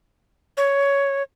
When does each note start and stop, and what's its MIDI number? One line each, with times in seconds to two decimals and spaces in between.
0.57 1.23 73